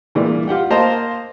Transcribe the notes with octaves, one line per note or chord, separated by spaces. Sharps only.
G2 A#2 E3 G#3
F4 G4 F#5 G5
A#3 C5 D#5 F5 A5 A#5